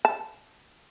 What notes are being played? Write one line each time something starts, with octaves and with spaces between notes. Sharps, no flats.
A5